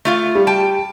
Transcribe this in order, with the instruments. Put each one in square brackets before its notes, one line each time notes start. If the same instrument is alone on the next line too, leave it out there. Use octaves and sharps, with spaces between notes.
[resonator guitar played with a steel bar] A3 F4 F5
[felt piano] G3
[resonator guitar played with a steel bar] G5 A5